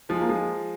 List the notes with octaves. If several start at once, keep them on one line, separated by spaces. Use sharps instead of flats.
F3 G#3
A#3
F3 G#3